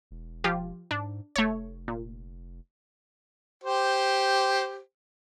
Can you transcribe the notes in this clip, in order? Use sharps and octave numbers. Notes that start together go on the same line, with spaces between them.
E1
F3 F4 G4
G#2 D4
F1 A3 C#5
A#2
G4 C5